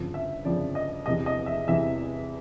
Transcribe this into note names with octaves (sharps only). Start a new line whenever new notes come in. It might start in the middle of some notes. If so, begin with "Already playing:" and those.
Already playing: G1 F2 C#3 F3
E5
G1 F2 C#3 F3 D5
D#5
E2 C3 E3 D#5
D#5
E5
E2 C3 E3 E5